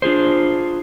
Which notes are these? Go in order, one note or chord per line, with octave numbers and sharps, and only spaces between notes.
D4 F4 G#4 C5